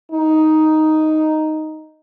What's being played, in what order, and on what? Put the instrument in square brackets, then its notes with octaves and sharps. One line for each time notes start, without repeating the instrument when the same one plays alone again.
[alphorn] D#4